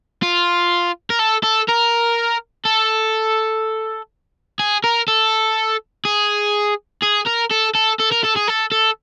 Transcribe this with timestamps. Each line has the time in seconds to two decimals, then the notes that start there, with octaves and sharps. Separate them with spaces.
0.22 F4
1.10 A#4
1.19 A4
1.43 A4
1.68 A#4
2.65 A4
4.59 G#4
4.84 A#4
5.08 A4
6.05 G#4
7.02 G#4
7.26 A#4
7.51 A4
7.75 A4
7.99 A4
8.12 A#4
8.24 A4
8.36 G#4
8.48 A4
8.72 A4